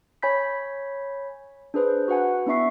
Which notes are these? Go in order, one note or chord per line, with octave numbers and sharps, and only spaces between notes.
C#5 G#5 B5 G6 B6
D4 G#4 B4 C5
F#4 B4 F#5 G#5
B3 D4 E4 E5 C#6 C7